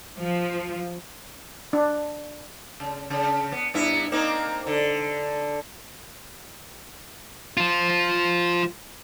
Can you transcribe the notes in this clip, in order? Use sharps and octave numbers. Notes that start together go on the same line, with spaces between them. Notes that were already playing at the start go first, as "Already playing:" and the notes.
F3
D4
C#3
C#3
B3
G2 B3 E4
A#3 C4 D#4
D3
F3 F4